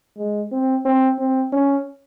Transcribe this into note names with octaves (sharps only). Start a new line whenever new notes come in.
G#3
C4
C4
C4
C#4